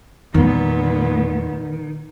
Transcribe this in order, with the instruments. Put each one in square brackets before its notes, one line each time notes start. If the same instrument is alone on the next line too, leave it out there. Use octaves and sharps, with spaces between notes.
[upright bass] E2 G3 [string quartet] A#2 B3 [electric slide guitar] D#3